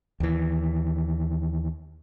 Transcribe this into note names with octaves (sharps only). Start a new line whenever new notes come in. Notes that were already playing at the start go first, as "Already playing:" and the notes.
D#2 E3